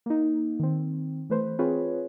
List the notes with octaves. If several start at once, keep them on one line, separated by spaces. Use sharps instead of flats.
A#3 D#4
D#3 C4
E3 A3 B4 C5
C4 F4 G#4 B4 C#5